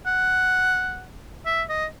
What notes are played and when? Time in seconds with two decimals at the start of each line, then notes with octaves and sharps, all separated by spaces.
0.07 F#5
1.46 E5
1.69 D#5